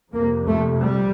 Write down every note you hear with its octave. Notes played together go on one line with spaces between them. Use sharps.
F2 C3 A#3
A3
G3